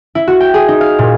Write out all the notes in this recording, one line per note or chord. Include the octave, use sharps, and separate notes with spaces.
E4
F#4
G5
G#4
D#4
F5
A#2